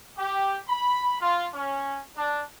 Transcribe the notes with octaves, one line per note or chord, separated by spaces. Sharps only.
G4
B5
F4
C#4
D4